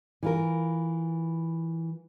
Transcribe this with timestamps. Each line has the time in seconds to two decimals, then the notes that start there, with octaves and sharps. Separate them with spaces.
0.23 E3 F4 A#4